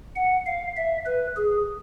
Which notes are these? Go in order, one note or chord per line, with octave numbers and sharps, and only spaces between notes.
F#5
F5
E5
B4
G#4